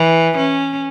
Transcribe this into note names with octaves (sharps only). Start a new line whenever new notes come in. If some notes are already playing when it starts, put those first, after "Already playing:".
Already playing: E3
C#4